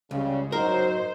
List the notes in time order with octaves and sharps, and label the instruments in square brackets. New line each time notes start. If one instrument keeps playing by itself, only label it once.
[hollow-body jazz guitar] C#2 [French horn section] C#3 G3
[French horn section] F#3 D#4 [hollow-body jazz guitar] A#4 [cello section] C5